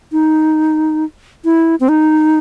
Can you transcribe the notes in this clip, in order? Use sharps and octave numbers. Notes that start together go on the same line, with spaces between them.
D#4
E4
C4
D#4